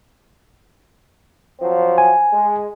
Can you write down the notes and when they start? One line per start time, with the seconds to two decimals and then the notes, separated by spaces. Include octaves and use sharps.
1.60 F3 F#3 C4
1.98 G#5
2.33 G#3